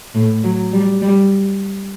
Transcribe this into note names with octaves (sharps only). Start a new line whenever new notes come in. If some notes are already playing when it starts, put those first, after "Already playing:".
A2
F#3
G3
G3